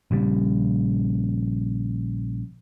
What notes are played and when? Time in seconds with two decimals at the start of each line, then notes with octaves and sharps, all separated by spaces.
0.11 A#1 C#3 G3